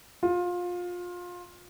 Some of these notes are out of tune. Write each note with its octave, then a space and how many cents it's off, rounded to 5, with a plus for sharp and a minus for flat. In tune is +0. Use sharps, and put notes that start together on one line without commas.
F4 +25